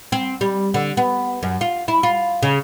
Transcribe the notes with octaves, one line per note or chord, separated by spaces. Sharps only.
C4
G3
D3
B3
F#2
F4
E4
F4
C#3